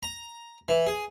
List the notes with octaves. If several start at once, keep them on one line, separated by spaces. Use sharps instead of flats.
A#5
E3
G#4